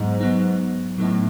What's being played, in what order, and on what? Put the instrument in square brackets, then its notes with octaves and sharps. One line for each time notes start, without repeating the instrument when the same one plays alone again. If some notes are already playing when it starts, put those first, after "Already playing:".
Already playing: [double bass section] G#2 [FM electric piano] F#3 B3 D#4
[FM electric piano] F#3 B3 D#4
[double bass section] A2 [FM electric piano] F#3 B3 D#4